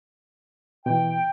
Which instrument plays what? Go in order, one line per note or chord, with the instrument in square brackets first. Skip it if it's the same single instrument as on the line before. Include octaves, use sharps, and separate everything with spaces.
[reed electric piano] B2 E3 [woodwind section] G5